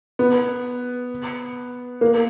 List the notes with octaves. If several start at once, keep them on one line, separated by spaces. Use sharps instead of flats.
B3
A#3